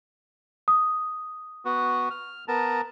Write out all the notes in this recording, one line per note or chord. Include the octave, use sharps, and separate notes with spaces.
D#6
B3 F#4
F6
B3 A#4 A5